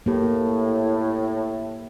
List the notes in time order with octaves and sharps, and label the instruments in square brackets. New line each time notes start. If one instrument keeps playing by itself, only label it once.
[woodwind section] A2 [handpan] A#3 G4